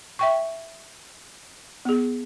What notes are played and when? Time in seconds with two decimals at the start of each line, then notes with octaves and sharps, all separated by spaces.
0.19 E5 G5 C#6
1.85 B3 G#4